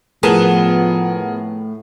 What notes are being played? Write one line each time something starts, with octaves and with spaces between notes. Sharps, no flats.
A2 F3 B3 G#4 A#4 A5 D#7 E7